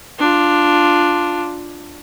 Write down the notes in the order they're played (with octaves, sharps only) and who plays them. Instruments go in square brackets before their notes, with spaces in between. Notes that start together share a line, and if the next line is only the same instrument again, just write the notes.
[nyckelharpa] D4 F4